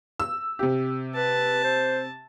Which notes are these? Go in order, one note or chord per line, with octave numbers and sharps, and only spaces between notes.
E6
C3 G4
B4 A5
C5